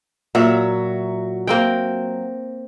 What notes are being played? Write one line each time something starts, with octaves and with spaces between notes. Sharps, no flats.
A#2 F#3 F#4 E5
A#3 C4 G5